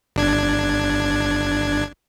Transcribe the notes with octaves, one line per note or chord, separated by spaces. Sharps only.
G1 D4 G#6